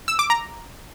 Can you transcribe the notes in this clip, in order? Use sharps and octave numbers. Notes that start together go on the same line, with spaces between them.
E6
D6
A#5